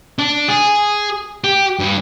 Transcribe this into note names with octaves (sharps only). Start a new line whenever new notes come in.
D4
G#4
G4
G2